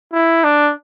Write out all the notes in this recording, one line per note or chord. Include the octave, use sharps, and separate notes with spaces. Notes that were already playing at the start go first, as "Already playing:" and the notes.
E4
D4